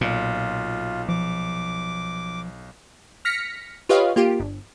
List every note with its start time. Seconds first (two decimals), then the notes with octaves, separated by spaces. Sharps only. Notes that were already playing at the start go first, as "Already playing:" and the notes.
0.01 B1 A#2 F4
1.09 F3 D6
3.25 F6 A#6 B6 C#7
3.89 F4 G4 B4 C#5 D#5 F5
4.16 A#3 F4 G4
4.40 G1